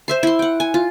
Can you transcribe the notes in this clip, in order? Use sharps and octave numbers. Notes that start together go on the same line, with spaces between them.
C5 E5 C6
E4 C6
F#5 G5
G#5
F4